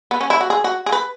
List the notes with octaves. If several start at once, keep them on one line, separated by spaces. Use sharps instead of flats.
B3
C#4
E4
F#4
G#4
F#4
G#4
B4